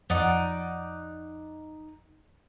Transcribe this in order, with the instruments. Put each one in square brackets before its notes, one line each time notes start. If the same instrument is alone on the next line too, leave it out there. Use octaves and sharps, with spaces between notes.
[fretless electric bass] F2 [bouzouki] D#4 D5 F#5